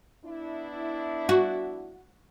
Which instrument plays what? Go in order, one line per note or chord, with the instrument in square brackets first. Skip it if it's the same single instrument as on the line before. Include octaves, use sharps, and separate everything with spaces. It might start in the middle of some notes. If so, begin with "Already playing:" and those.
[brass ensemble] B3 D4 E4
[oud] F#4